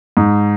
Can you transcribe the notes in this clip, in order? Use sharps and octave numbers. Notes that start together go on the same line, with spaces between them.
G#2